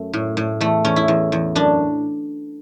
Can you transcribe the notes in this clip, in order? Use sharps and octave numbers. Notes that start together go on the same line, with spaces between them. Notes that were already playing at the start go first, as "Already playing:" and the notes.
Already playing: F#2 A3
A2
A2
E2 A3
E2 C#4
E4
E2
E2
F#2 D4